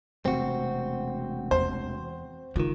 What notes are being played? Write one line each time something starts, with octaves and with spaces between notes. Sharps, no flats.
E1 C3 A3 C4 F#4
E2 C5
C#2 D#3 F4